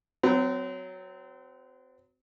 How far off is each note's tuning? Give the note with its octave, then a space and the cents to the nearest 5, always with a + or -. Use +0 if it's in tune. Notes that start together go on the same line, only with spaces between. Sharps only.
F#3 +0 C4 -35